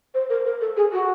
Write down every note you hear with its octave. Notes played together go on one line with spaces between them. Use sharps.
C5
A#4
A#4
A4
G#4
F#4